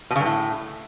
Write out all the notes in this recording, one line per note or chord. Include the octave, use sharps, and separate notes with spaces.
B2
C#3
G2
A2